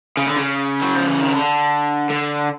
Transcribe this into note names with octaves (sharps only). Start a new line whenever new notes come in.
C#3
D3
C#3
F#3
F3
E3
D#3
D3
D3